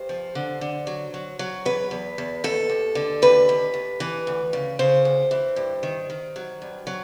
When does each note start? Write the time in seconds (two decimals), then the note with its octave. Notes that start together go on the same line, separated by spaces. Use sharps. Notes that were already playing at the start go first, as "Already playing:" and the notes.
Already playing: G2 C5
0.09 F3
0.35 D3
0.61 D3
0.87 F#3
1.14 F#3
1.39 F#3
1.65 E2 B4
1.91 E2
2.18 E2
2.44 D#2 A4
2.69 D#2
2.95 D3
3.22 D#2 B4
3.49 D#2
3.74 D#2
4.00 E3
4.27 D2
4.53 C#3
4.79 C#3 C5
5.05 D2
5.31 E3
5.56 G2
5.83 D#3
6.10 D#3
6.36 F#3
6.62 G2
6.87 F#3